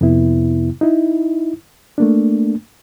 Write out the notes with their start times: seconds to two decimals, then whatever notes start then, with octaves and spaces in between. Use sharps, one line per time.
0.01 F2 C3 B3 E4
0.81 D#4 E4
1.98 A3 A#3 D4